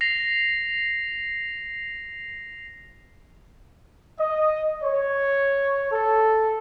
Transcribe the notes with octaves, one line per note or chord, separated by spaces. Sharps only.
A#6 C7 F7
D#5
C#5
A4